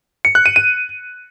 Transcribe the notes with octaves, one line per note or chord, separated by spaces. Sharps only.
C#7
F#6
D#7
D#7